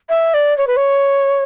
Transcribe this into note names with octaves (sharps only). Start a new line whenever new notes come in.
E5
D5
C#5
B4
C#5